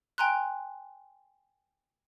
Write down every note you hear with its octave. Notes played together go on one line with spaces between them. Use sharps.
G5 G#5 A#5 C6 F#6